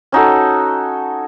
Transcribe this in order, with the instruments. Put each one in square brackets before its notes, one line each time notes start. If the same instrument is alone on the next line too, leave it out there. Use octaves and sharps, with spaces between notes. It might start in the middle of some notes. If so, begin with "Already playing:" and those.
[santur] C#4 D#4 F#4 A4